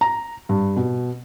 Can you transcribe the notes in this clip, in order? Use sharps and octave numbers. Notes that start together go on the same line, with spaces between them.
A#5
G2
B2